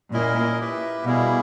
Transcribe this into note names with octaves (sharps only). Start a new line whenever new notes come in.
A#2 C#4 E4 A#4 D#5
E4 G4 B4 E5
B2 G3 A#3 E4 G#4